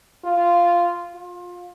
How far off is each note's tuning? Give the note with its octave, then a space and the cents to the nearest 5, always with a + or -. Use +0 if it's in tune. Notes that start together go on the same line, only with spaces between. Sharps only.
F4 -10
F4 +25